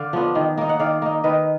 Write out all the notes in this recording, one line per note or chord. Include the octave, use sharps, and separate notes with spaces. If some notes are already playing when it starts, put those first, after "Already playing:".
Already playing: D3 D5 F5
F3 B3 D4
D#3
A#3 D#4
F#5
D#3 D5 F5
A#3 D#4
D#3 B4 D#5